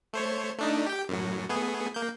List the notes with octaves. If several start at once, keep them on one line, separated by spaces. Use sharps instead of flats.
A3 C5 C#5
A3 D4 D#4
G4 G5
F#2 A2 F#3
A3 B3 G#4
A#3 G6